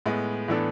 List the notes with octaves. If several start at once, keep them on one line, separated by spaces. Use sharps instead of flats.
A2 G#3 B3
A2 E3 B3 D4 A4